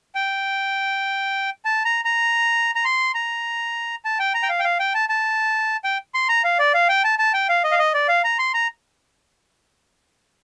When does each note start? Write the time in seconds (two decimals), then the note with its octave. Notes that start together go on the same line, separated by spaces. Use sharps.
0.15 G5
1.65 A5
1.85 A#5
2.05 A#5
2.75 A#5
2.85 C6
3.14 A#5
4.05 A5
4.19 G5
4.34 A#5
4.43 G5
4.49 F5
4.59 G5
4.64 F5
4.80 G5
4.94 A5
5.09 A5
5.84 G5
6.14 C6
6.29 A#5
6.44 F5
6.59 D5
6.74 F5
6.89 G5
7.04 A5
7.19 A5
7.34 G5
7.49 F5
7.64 D#5
7.71 F5
7.79 D#5
7.94 D5
8.08 F5
8.24 A#5
8.39 C6
8.54 A#5